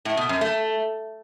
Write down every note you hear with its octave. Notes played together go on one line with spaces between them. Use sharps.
A2
B2
F#2
A3